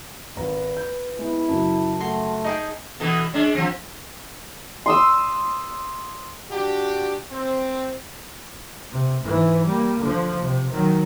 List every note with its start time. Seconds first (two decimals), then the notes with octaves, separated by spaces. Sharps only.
0.36 G#1 B4 A#5
0.77 G6
1.19 G#3 B3 E4
1.48 F#2 C#3 F#3 A5
2.00 A3 F#4 C6
2.44 D#4 G#4 G5
3.00 B2 E3 A4
3.33 G#3 C#4 D4
3.55 F3 C4
4.86 C6 D#6 E6
6.51 D4 F#4 G4
7.31 C4
8.91 C3
9.23 G#2 E3
9.65 G3 A#3
10.01 D3 F3
10.40 C3
10.72 D#3 F#3